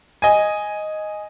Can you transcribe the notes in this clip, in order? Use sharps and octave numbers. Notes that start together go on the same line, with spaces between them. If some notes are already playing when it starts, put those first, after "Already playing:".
D#5 G#5